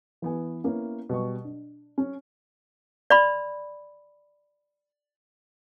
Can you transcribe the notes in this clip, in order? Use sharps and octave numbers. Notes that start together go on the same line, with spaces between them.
E3 B3 G#5
A#3 B3 C#4 E4
B2 G3 C#6
D4
C#4
D5 B5 C6